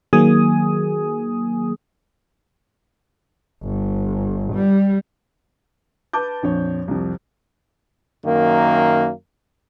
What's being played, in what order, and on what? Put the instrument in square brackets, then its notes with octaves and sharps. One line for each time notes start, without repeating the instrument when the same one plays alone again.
[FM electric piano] D#3 F#3 A#3 G#4 G#5 D#6
[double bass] G1
G3
[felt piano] B4 A5 D6 G6
A#1 F2 C#5
C2 F2
[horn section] F#2 D#3 A#3